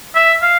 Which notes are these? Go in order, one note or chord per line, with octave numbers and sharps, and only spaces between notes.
E5
F5